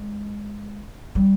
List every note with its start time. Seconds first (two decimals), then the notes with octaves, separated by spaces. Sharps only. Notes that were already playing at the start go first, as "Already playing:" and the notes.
Already playing: G#3
1.15 G3